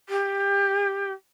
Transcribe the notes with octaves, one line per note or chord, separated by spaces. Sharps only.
G4